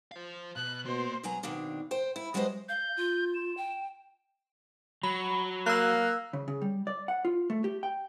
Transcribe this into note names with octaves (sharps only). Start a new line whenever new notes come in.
C5 F5
B2 F#6
B2 A#3 C5 C6
B2 F#3 G#5 A#5
D#2 B2 D#3 C4 D4 F5
C5 G5
E4
F#3 G#3 G4 B4 C5 D#5
F5 G6
F4
E7
G5
F#3 B5
A#3 E6 F#6
C#3
C#3
G3
D5
F#5
F4
A3
G4
G5